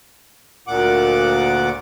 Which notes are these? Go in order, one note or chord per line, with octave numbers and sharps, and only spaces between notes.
D2 A#2 F#5 D6